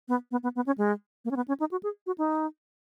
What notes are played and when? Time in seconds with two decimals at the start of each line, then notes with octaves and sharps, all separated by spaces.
0.08 B3
0.31 B3
0.43 B3
0.56 B3
0.66 C#4
0.78 G#3
1.25 A#3
1.31 C#4
1.36 B3
1.48 C#4
1.60 D#4
1.71 F#4
1.83 G#4
2.07 F#4
2.18 D#4